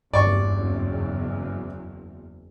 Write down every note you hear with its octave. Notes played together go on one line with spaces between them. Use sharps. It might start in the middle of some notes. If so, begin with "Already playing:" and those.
F#1 E2 G2 D5 C#6